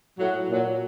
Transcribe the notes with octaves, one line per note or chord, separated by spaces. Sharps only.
A2 F#3
A#2 F#3